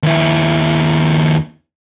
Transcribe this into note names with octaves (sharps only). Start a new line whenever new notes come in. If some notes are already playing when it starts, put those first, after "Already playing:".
D#2 E4